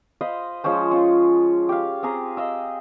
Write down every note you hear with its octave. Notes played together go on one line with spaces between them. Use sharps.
C5 D#5 F5 B5
F3 G#3 C#4 C5
C#4 F4
G4 F5
C4 G4 G#4 A#5
D#5 F5 E6